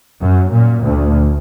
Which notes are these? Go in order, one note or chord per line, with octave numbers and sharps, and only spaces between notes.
F#2
A#2
D2